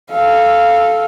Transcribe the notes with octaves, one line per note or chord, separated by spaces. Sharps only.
A4 F5